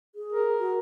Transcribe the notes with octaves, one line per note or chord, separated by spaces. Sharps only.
G#4
A#4
F#4